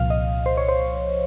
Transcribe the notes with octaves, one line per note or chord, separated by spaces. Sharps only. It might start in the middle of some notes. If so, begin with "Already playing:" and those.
Already playing: C2 A#2 F3 F5
D#5
C5
C#5
C5